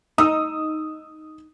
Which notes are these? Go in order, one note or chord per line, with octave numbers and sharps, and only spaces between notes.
D#4 D#6 E6